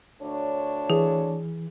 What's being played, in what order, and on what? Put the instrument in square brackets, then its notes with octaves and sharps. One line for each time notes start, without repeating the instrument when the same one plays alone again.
[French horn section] D2 D4 C#5
[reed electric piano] E3 [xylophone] G#4